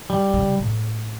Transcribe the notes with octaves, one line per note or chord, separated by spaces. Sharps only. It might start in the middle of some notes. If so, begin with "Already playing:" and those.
G3
C#3
A2